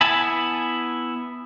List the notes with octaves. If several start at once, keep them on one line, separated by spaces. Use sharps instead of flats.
B3 E4 G#5 A5 B5